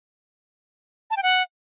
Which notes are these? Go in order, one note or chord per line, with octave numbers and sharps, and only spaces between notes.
A5
G5
F#5